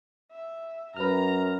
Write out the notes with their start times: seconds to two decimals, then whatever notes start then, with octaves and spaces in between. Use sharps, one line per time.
0.31 E5
0.96 F#2 B4 A#5 F6